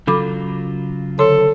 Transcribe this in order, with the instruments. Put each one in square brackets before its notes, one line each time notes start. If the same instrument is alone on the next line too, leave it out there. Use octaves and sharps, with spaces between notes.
[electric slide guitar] C#3 F#3 F4 [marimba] A4 B5 D6
[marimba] D3 C#5 C6 [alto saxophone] A4